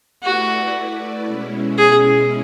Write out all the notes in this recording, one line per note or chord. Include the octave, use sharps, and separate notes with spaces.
A3 E4 F#4 B4 D5
B2 G#3 C#4 E4
G#4